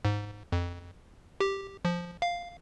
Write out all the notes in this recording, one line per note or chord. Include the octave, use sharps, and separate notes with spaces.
G#2
F2
G4
F3
F5